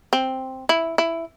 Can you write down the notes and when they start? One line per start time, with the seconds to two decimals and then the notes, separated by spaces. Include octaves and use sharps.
0.13 C4
0.69 E4
0.98 E4